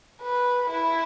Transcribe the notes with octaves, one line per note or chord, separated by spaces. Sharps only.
B4
E4